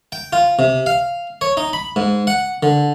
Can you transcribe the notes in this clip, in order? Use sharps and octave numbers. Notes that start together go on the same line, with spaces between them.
G5
F4
C3
F5
C#5
D#4
B5
G#2
F#5
D3